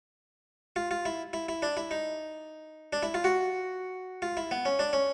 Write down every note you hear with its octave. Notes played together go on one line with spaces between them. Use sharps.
F4
F4
E4
E4
E4
D4
E4
D#4
D4
E4
F4
F#4
F4
E4
B3
C#4
D4
C#4